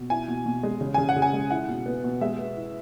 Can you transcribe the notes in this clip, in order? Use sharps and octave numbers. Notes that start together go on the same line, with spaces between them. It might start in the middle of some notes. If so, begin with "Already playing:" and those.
Already playing: B2
E4 G#5
B2
B2
G#3
C#3
C#3 G#5
F#5
C#3
G#5
G#3
E4 F#5
B2
B3
B2
G#3 E5
B3
E4